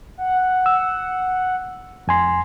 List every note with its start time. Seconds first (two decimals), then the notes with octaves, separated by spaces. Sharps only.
0.18 F#5
0.66 E6
2.08 F2 G#5 C6